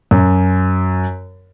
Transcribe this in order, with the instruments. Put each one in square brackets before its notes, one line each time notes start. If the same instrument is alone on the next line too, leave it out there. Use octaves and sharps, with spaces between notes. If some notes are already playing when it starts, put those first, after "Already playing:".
[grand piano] F#2